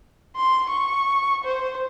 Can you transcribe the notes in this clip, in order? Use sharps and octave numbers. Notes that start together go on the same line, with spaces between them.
C6
C#6
C5